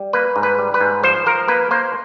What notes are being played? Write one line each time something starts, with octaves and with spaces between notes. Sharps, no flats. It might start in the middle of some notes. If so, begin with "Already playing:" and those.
Already playing: G3
A#3 B4
G#2
B4
G3
B4
G#2
F3 C5
F3 A#4
A#3 B4
A#3 C5